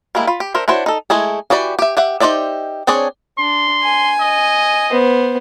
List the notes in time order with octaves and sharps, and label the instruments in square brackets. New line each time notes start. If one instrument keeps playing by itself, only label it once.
[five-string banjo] G3 G#3 A#3 E4
F4 B5
G4
D4 A4 A#4 C5 E5
D4 E4 F#4 C5 C#5
D#4 A4
G#3 A3 E4 G#4
E3 F#4 G4 D5 B5
G4 E5
G4 E5 F#5
D#4 G4 C5 D5 E5
C4 D4 G#4 C#5 D5
[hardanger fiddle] D4 [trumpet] C6
[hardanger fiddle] G#5
[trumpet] D#5
[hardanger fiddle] B3 C5